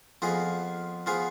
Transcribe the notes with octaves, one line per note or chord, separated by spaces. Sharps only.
F2 F3 B3 F4 G#4
F3 B3 F4 G#4